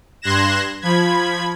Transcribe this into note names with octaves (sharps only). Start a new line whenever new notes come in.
G2 C6 F#6 G#6 A#6 E7
F3 B5 G#6